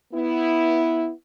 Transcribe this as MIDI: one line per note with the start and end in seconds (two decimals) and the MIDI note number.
0.13 1.11 59
0.13 1.11 64